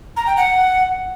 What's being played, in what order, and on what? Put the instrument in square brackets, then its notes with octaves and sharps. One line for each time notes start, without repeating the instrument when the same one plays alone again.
[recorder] A#5
G5
F#5